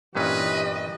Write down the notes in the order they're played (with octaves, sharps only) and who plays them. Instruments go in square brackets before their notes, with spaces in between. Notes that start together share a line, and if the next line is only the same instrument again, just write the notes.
[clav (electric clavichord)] G2 A#2 C#4 [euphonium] E3 [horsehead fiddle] G4 D#5 [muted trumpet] B4